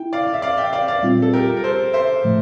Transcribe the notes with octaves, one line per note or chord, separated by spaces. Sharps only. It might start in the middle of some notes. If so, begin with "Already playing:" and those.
Already playing: E4 G5
D5 F5
E5
D5 F5
E5 G5
D5 F5
D5 F5
A#2 G3 C4 F4
A4
G4 A#4
A#4
A4 C5
C5 E5
A2 F3 A3